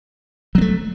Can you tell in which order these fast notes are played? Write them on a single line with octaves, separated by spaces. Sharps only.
F#3 B3 A3